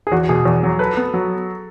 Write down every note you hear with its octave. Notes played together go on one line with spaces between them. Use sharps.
G#4
E2 F#4
B2 G#4
E2
F#3
A4 B4
B3
F#3